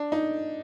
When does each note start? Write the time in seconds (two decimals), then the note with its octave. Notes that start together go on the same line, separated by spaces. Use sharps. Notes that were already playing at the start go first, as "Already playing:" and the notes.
Already playing: D4
0.12 D#4